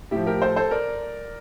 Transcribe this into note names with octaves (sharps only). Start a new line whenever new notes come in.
A2 F3 E4 G4
G4 A#4
A4 C5
A4 C5
A#4 D5